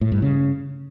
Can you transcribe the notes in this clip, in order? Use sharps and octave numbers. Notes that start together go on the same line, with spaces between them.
A2
G2
C#3